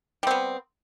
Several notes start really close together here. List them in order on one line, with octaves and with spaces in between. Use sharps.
G3 C4 B3